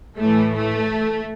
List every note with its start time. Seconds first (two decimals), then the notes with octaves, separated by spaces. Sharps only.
0.18 A2 E3 A3
0.55 A3